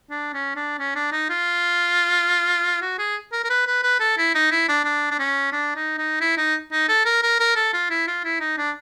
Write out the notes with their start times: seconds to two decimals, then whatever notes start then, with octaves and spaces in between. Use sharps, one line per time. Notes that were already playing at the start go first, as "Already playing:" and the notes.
0.10 D4
0.34 C#4
0.56 D4
0.79 C#4
0.95 D4
1.12 D#4
1.30 F4
2.82 F#4
2.98 G#4
3.33 A#4
3.44 A#4
3.50 B4
3.67 B4
3.83 B4
4.00 A4
4.18 E4
4.35 D#4
4.51 E4
4.69 D4
4.85 D4
5.11 D4
5.19 C#4
5.52 D4
5.76 D#4
5.98 D#4
6.20 E4
6.37 D#4
6.72 D#4
6.89 A4
7.05 A#4
7.23 A#4
7.40 A#4
7.56 A4
7.73 F4
7.90 E4
8.07 F4
8.24 E4
8.40 D#4
8.57 D4